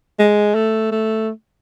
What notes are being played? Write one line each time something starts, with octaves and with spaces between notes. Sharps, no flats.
G#3
A3
A3